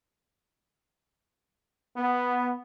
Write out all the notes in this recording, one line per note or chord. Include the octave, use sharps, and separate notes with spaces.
B3